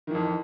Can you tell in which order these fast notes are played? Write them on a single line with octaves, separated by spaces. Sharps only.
D#3 E3 F2